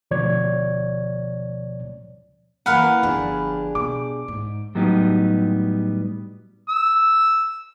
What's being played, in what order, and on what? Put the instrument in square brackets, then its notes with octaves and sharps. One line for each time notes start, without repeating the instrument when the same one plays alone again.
[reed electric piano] D2 B2 F3 C#5 D5 G#6
[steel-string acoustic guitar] E3 A#3 C#4 [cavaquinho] A#4 F5 F#5 [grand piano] B5
[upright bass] G1 F3 [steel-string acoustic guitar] D4 G4 G#4
[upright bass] B2 [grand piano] D6
[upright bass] G#2
[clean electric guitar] A2 F#3 G3 B3 D#4 G4
[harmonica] E6